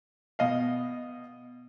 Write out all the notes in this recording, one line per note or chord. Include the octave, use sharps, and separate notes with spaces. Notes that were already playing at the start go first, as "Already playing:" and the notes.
B2 D#5 F5